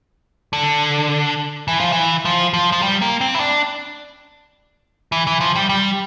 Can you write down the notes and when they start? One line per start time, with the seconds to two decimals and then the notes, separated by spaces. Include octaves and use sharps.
0.53 D3
1.68 E3
1.80 F3
1.92 E3
2.25 F3
2.54 F3
2.72 F3
2.82 G3
3.02 A#3
3.21 C4
3.35 E4
3.40 D4
5.12 E3
5.27 E3
5.41 F3
5.55 G3
5.69 G3